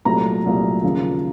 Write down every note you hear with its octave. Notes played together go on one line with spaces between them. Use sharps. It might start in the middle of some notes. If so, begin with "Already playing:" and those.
C2 A#2 F#3 A3 A#5
C2 A#2 F#3 A3
D#2 C#3 F3